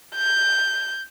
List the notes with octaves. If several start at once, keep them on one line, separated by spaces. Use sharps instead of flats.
G6